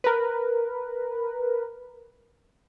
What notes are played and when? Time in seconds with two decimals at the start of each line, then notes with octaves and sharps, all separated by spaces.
0.04 A#4 B4